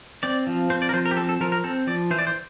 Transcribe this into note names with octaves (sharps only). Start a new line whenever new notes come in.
C4 D5
F3
C4 C5
D5
A#4
F3 C5
A#4
G4
C4 A4
A4
F3 A#4
A#4
C4 A4
F3 D5
E3 C5
D5
C5